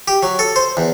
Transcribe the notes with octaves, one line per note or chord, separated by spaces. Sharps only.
G4
F#3
A4
C5
E2